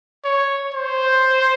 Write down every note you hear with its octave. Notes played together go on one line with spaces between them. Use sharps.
C#5
C5